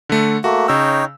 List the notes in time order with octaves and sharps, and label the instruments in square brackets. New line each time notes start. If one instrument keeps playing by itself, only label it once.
[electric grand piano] D3 A3
[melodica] A3 A#3 [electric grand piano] F#4
[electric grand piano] C#3 E6 [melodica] D#4 C#5 G5